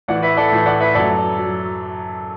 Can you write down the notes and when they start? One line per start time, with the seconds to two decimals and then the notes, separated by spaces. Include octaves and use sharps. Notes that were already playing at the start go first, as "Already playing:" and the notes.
0.08 A2 E3 D5 F#5
0.22 B4 E5
0.37 A4 D5
0.52 A2 E3
0.66 D5 F#5
0.80 B4 E5
0.95 F#2 F#3 A4 D5
1.38 F#3